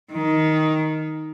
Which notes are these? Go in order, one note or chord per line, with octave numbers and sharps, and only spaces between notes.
D#3